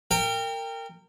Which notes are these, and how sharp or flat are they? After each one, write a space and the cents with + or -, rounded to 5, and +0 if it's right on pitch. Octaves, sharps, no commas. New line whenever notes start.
A#4 -25 G5 +20